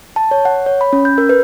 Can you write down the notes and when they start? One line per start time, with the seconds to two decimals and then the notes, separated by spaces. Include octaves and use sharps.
0.16 A5
0.31 C#5
0.45 F#5
0.66 C#5
0.81 B5
0.93 C#4
1.05 G6
1.18 A#4
1.29 B4